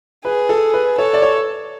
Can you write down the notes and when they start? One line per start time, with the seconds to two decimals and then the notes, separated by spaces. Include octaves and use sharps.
0.25 G#4 B4
0.49 A4
0.74 B4
0.98 A4 C#5
1.13 D5
1.22 C#5